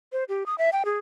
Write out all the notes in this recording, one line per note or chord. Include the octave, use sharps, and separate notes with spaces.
C5
G4
D#6
E5
G5
G#4